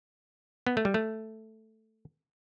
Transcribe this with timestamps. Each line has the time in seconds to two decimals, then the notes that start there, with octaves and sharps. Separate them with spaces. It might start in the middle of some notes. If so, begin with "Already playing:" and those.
0.67 B3
0.77 A3
0.85 G3
0.94 A3